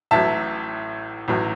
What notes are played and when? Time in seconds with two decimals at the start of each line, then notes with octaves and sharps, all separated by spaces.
0.11 A1 A2 F#3 E5 A5
1.28 A1 A2 F#3